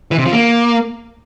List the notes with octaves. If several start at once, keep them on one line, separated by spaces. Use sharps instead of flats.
E3
C3
F3
A#3